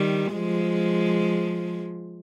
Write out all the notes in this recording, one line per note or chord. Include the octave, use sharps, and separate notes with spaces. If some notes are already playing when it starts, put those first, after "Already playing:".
Already playing: D#3 G3
F3 G#3